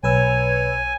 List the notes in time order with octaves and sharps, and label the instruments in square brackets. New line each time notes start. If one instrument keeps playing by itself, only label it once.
[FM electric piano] B1 B4 E6 [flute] C#5 [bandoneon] G#5